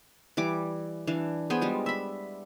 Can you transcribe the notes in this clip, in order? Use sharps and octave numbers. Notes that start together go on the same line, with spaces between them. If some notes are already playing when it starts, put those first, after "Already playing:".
E3 G3 D6
E3 D4 F5
B3 G#4 C5 G5
G3 G#3 F4
E5 B5